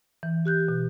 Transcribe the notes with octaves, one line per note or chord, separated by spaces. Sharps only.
E3
G4 F#6 G6
B2